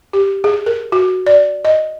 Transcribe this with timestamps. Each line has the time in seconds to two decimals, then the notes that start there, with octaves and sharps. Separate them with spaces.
0.13 G4
0.44 G#4
0.66 A#4
0.92 F#4
1.26 D5
1.65 D#5